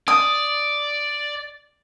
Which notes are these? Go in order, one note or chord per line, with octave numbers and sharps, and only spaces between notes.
D5 D#6